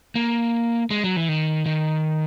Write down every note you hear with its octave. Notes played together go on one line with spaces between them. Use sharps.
A#3
G#3
F#3
E3
D#3
D#3